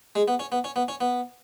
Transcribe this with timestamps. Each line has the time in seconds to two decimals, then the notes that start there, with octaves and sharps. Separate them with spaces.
0.15 G#3
0.28 B3
0.39 C#4
0.52 B3
0.64 C#4
0.76 B3
0.88 C#4
1.01 B3